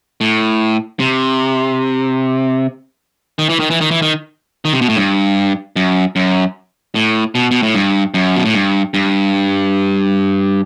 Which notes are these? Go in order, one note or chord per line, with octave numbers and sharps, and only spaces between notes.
A2
C3
D#3
E3
D#3
E3
D#3
E3
D#3
D#3
C3
B2
A2
G2
F#2
F#2
A2
B2
B2
A2
G2
F#2
B2
A2
G2
G2